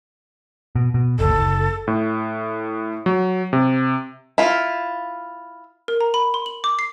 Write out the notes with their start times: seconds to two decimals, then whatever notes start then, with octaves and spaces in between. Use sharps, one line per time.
0.75 B2
0.94 B2
1.19 F#1 D2 A4
1.31 F#1
1.88 A2
3.06 F#3
3.53 C3
4.38 E4 F4
5.88 A#4
6.01 A#5
6.14 B5
6.34 C6
6.46 F#7
6.64 D6
6.79 C7